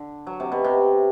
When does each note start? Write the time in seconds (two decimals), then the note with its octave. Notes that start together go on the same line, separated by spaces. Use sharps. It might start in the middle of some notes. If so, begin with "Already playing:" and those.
Already playing: D3
0.27 F#3
0.40 C3
0.52 B2
0.64 C3